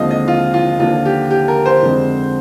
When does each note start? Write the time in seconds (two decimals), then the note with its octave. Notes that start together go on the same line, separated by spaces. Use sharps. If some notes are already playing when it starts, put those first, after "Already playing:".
Already playing: D#2 D3 F3 G#3 C4 D#5 F5
0.11 D#5
0.28 F4
0.54 F4
0.79 D#2 D3 F3 F4
1.05 G4
1.31 G4
1.48 A#4
1.65 C5
1.82 F2 D3 G#3 C4